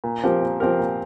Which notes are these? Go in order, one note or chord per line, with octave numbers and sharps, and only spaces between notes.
A#2
F3 C4 G4 A#4
A#2
F3 C4 G4 A#4
A#2